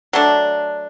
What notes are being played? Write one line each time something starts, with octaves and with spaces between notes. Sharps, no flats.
F#3 A3 D4